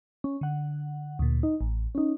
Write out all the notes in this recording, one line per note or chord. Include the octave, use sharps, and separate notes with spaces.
C#4
D3 F#5
D2 A#2
D#4
A1
C#4 D#4